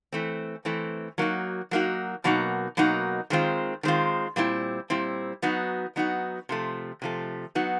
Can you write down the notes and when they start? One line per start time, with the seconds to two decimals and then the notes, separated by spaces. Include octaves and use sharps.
0.12 E3 A3 C4
0.65 E3 A3 C4
1.18 F#3 A#3 D#4 F#4
1.71 F#3 A#3 D#4 F#4
2.24 B2 F#3 A#3 D#4 F#4
2.77 B2 F#3 A#3 D#4 F#4
3.30 D#3 G#3 C4 F4
3.83 D#3 G#3 C4 F4
4.36 A#2 G3 C4 E4
4.90 A#2 G3 C4 E4
5.42 F#3 B3 D#4 F#4
5.96 F#3 B3 D#4 F#4
6.49 C3 F3 A3
7.02 C3 F3 A3
7.55 F#3 B3 D#4 F#4